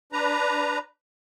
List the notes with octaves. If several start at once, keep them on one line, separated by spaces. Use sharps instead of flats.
D4 B4 A#5